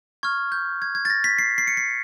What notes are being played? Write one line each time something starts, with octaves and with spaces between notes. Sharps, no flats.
C#6 F6 G#6
G6
G#6
G#6
A6
A#6
B6
C7
C7
C#7
C7